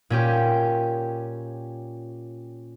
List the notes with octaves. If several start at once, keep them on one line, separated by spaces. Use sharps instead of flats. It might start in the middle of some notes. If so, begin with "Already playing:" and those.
A#2 C#4 G4